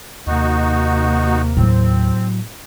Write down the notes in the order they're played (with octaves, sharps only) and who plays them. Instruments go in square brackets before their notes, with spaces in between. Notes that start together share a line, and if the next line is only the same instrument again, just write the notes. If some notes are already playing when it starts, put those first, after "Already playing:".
[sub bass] D#2 [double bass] C3 A#3 [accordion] D#4 F#4
[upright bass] A2 F#3 [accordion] C4